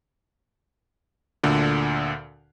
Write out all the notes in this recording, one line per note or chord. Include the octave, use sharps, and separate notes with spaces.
D2 A#2 D3